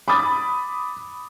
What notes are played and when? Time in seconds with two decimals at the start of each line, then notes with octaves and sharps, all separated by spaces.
0.08 B5 D6 D#6 A6